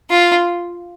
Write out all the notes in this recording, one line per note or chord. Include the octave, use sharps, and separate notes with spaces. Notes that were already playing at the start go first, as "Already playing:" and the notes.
F4